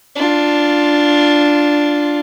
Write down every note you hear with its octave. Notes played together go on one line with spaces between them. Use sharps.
D4 F4